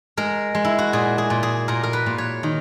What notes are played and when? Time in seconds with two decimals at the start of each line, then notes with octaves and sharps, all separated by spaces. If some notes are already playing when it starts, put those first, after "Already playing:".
0.17 G#3 A#4
0.55 G#3
0.65 E4
0.79 F#4
0.93 A#2 G#4
1.18 G#4
1.30 A#2
1.43 G#4
1.68 A#2 A#4
1.83 A#4
1.93 B4
2.06 A#2
2.18 C#5
2.43 D#3